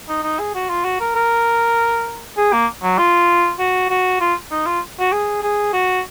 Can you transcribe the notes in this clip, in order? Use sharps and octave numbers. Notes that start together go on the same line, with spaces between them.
D#4
D#4
G#4
F#4
F4
F#4
A#4
A#4
G#4
A#3
F#3
F4
F#4
F#4
F4
D#4
F4
F#4
G#4
G#4
F#4